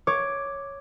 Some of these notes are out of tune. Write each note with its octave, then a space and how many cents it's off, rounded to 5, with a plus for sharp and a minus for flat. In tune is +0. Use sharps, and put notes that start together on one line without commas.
C#5 +0 D6 +0